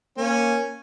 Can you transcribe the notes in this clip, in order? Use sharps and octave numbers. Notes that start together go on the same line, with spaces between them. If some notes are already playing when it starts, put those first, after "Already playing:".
A#3 C#4